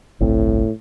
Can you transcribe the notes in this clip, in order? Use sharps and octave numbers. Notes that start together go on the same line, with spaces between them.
G1 C2 A2 C4